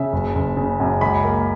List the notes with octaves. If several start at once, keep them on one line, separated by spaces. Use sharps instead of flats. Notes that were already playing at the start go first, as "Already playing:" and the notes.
Already playing: C#3 E5
F#1
F#1
C#3
F#2
C#2 B5
A#3